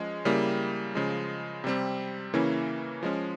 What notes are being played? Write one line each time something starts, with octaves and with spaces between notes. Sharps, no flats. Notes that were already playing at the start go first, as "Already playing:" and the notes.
Already playing: F3 G#3 C#4
C#3 G3 A#3 E4
C#3 F3 G#3
C3 G3 C4
C#3 E3 A#3 C#4 E4
F3 G#3 C#4